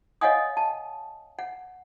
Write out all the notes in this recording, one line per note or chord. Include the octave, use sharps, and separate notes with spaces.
C#5 D#5 F5 F#5 G#5 D#6
A5
F#5